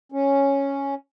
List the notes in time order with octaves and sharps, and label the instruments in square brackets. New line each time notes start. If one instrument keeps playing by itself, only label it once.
[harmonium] C#4